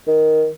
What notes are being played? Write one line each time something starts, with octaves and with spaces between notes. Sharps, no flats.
D#3